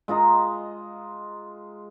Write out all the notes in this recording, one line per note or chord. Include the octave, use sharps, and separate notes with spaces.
G#3 F4 D#5 A#5